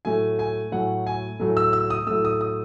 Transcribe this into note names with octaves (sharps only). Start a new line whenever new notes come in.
A2 F#3 A3 G#5
G#5
A2 F#3 A3 F#5
G#5
A2 F#3 A3
E6
E6
D#6
A2 F#3 A3 E6
D#6
D#6